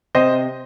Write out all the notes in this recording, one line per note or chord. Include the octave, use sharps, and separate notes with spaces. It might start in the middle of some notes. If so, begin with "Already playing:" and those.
C3 C5 D#5